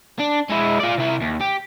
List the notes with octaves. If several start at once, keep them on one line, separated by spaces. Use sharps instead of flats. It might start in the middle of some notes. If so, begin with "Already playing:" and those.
D4
G#3 E4
F4 D5
C3 E4
D#2
G4